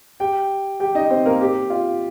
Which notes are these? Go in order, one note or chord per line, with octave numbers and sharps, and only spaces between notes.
G4 G5
G4 G5
D#4 D#5
C4 C5
A#3 A#4
G4
F4